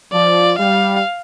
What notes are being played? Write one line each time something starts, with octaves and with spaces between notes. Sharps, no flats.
F3 D5
G3 F5